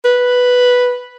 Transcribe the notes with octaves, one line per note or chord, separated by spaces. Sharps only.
B4